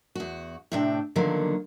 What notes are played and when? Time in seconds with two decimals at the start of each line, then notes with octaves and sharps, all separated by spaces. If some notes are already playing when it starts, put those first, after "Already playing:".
0.15 E2 F#4
0.72 A2 C3 D4 E5 G5
1.16 D3 D#3 F3 F#3 A#3 B3